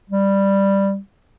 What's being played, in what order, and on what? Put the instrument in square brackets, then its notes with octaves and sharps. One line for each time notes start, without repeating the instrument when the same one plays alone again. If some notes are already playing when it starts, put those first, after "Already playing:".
[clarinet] G3